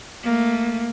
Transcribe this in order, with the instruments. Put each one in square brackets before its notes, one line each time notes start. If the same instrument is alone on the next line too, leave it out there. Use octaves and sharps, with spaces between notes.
[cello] A3 A#3